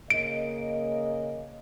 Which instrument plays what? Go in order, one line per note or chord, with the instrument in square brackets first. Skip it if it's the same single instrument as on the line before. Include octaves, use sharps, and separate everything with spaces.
[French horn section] C#3 A#3 D#5 [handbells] D7